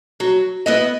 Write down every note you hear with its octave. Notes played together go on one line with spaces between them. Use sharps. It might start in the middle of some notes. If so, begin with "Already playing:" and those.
F#3
B3 E4 B4 D#5